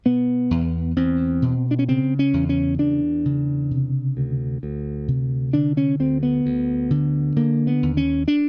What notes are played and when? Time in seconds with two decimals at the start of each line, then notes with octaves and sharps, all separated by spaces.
0.05 B2 B3
0.51 E2
0.96 E2 C4
1.42 B2
1.71 D4
1.79 C#4
1.88 C#3 C4
2.19 C#4
2.33 E2
2.49 C#4
2.79 E2 D4
3.25 C#3
3.71 C3
4.17 D2
4.63 D2
5.08 C3
5.53 D3 D4
5.77 C#4
6.00 D2 C4
6.23 B3
6.46 D2
6.91 D3
7.36 D3 A#3
7.67 B3
7.83 D#2
7.97 C#4
8.28 D4